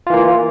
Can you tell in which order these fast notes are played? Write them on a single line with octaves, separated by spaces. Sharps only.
F4 E3 A#3